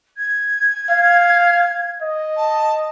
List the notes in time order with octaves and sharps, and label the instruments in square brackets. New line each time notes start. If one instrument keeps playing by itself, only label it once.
[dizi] G#6
[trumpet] F5
D#5
[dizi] A5